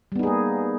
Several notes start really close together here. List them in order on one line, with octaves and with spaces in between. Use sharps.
G3 B3 D#4 G#4 A#3